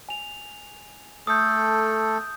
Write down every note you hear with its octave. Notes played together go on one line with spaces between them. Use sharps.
G#5 F7
A3 A4 D#6 G6